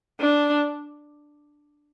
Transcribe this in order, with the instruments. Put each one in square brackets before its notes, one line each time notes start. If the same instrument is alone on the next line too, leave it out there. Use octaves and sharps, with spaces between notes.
[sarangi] D4